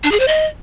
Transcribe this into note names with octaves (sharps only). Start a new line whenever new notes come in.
D4
G#4
C5
D#5